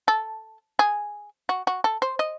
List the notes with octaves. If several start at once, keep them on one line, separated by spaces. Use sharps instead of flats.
A4
G#4
F#4
F#4
A4
C5
D#5